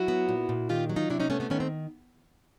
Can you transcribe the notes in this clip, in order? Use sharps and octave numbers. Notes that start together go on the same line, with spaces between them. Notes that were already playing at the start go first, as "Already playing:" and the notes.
Already playing: F#3 E4 F#4
B3
A#2
A#2
D#3 F4 G4
F#3
D#4 F4
C3 D4 E4
C#4 D#4
A3 B3 C#4
B3 C#4
D#3 B3 C#4
C4